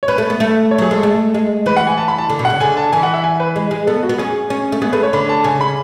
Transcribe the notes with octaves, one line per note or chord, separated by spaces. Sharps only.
C#5
C#4 B4
A3
B3
A3
C#5
F#3 G#4
G#3 A4
A3
G#3
E3 B4
F#5
G#5
A5
B5
A5
D3
B2
F#5
C#3
D3 G#5
A5
E3 G#5
F#5
E5
G#5
B4
G#3
G#3
B3 A4
F#4
B3
C#4 G#4
C#4
A3
B3 G#4
A3 B4
C#5
D3 B5
A5
C#3 G#5
B5